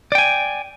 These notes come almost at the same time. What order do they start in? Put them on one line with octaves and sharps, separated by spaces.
D5 G5 G#5